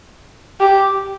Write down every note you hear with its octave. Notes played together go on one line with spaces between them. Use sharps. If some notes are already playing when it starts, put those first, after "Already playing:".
G4